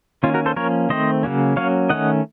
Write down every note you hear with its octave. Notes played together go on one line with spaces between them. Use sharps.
D#3 A#3 C#4 F4
F#4 A#4
A4 C5
F3 A#3 C#4 A#4 C#5
D#3 A3 C4 C5 D#5
C#3 F#3 A#3 C#4
F#3 A#3 C#4 C#5 F5
D#3 A3 C#4 D#5 F#5